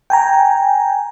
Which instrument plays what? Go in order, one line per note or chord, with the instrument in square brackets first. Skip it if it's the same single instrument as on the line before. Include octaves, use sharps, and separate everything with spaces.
[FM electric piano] G5 G#5 A#5